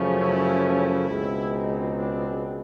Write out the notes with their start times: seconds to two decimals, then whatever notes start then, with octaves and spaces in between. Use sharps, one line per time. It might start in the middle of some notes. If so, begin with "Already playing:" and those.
Already playing: F#2 C#3 F3 A3 C#4
0.19 E4
0.63 E4
1.07 C#2 B2 G#3 C4
1.50 D#4
1.95 D4